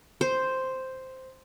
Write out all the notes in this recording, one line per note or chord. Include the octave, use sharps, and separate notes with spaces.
C5